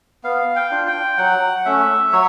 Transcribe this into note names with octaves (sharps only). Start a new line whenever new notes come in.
B3 F5
G5
D4 F4
G5
F#3 F#5
A3 C#4 E5
F#3 C#5